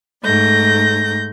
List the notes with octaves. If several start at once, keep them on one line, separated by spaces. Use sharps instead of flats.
G#2 A3 G6 A#6